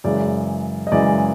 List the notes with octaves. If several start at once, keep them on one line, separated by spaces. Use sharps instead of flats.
F#2 C#3 E3 G#3 D5
D#5
F#2 C#3 E3 G#3 D5